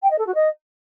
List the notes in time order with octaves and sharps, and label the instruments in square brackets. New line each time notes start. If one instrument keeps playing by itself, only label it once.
[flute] G5
D#5
A4
F#4
D#5